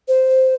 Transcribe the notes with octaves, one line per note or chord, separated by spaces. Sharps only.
C5